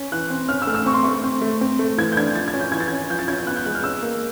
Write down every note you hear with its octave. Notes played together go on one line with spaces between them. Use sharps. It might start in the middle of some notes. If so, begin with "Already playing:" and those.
Already playing: C#4
E3 F#6
C4
C#4 F6
E6
A3 F6
E6
C4 C#6
C6
A3 C#6
C4
A3
C4
A3
E3 G#6
G6
D4 G#6
F3 A6
G#6
C#4
G6
E3 G#6
A6
C#4 G#6
F3 G6
A6
C#4 G#6
G6
B3 F#6
G6
G#3 F#6
F6
C#4 E6
A#3